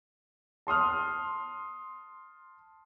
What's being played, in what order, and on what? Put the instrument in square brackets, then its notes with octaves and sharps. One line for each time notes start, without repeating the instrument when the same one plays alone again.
[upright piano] A5 C6 D#6 F6